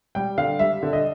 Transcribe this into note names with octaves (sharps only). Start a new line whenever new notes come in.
G3 G5
D3 F5
G3 E5
D3
D#5